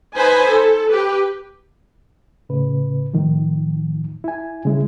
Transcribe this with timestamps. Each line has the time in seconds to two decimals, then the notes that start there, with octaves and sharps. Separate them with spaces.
0.14 D#4 B4 C5 G#5 B5
0.47 A4
0.90 G4 B4
2.49 A2 C#3 B4
3.14 A2 D#3 F3
4.24 E4 G#5
4.65 C#3 G#3 E4